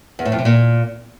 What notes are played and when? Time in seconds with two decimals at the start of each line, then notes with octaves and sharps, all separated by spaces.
0.19 E2
0.25 A2
0.32 F2
0.39 C3
0.45 A#2